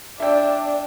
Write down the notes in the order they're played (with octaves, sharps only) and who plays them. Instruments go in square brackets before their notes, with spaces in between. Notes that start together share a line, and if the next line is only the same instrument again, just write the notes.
[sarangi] D4 [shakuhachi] D5 [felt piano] E5 G5